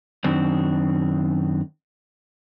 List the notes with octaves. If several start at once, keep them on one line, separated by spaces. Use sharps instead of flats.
F#2 D#3 C4 D4